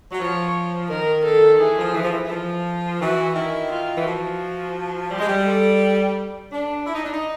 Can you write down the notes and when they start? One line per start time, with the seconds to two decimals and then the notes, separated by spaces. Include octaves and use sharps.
0.11 F#3
0.19 F3 C#5
0.89 D#3 A#4
1.24 A4
1.59 E3 G#4
1.77 F3
1.95 E3
2.03 F3
2.12 E3
2.25 E3
2.30 F3
3.00 E3 F#4
3.35 D#3 E4
3.71 F4
3.95 E3
4.05 F3 F#4
5.11 G3 G4
5.20 G#3
5.27 G3
5.46 A4
6.52 D4
6.86 E4
6.95 D#4
7.04 D4
7.12 D#4